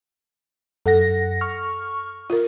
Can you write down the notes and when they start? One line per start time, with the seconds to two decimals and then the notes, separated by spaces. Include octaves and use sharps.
0.86 F#2 A4 F#5 A#6
1.41 C#6 F6
2.30 F4 A#4